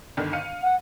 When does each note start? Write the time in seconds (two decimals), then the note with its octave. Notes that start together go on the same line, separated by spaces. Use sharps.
0.17 G1 D3 D#3
0.33 F5 C#7 D#7
0.63 F#5